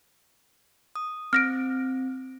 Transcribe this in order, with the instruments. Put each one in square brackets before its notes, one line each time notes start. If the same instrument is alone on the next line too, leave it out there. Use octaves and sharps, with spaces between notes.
[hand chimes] D#6
[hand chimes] C4 [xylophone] F6 A#6 D7